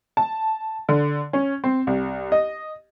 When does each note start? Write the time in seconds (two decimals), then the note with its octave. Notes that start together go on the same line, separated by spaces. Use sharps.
0.17 A5
0.89 D3
1.33 C#4
1.64 C4
1.87 C2
2.32 D#5